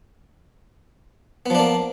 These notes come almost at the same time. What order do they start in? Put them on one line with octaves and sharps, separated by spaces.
B3 F3 D4 A#3